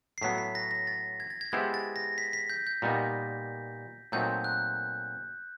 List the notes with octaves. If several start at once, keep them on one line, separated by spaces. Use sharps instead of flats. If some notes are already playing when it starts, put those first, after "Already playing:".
C7
A2 F#3 B3 B6
B6
A#6
A#6
A6
G#6
A6
G#6
G#3 B3 E4 G4 C5 G#6
A6
A#6
B6
B6
G6
G6
A#2 G3 B3 D#4
A#2 F#3 A3 C4 D#4 G6
F#6